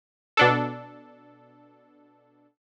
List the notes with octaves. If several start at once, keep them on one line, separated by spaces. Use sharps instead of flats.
B2 D4 A4